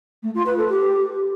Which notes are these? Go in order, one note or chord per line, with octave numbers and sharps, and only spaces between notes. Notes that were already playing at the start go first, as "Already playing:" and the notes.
A3
F4
B4
A4
G4